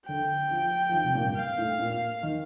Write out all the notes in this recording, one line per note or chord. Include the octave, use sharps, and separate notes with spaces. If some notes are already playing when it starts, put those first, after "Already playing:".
D3 G5
F3
F3
D#3
C3
A#2
G2
F5
A2
A#2
D#3